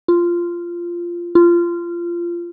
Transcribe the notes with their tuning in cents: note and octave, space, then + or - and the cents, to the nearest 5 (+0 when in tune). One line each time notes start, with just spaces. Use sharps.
F4 -10
F4 -20